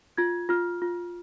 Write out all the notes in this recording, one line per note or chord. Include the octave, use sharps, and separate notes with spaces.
F4 G#6
F4 F6
F4